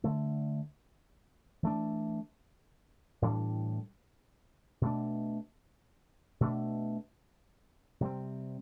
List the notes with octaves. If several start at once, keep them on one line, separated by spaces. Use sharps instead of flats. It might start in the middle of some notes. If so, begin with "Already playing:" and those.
D3 A3 D4
E3 A3 D4
A2 E3 G3 D4
B2 A3 D4
B2 A3 D4
C3 G3 C4